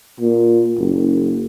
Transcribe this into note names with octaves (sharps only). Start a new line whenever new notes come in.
A#2
F#1